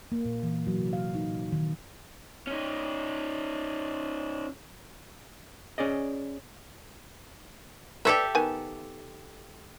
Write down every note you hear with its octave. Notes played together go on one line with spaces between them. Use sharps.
A#3
A#2
E3
F#3
C3
F5
D#4
A#2
D#3
C#4 D#4
C#4 G#4 D5 D#5
G4 A4 B4 C5 D5 E5
D#3 B3 G#5